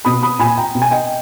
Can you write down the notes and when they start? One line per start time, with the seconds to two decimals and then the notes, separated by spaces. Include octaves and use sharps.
0.05 B2 B5 D#6
0.23 B5 D#6
0.39 A#2 G#5 B5
0.58 G5 A#5
0.75 B2
0.82 G#5
0.91 D#5 G5